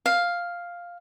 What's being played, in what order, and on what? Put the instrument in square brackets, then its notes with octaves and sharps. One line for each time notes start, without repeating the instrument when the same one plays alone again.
[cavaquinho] F5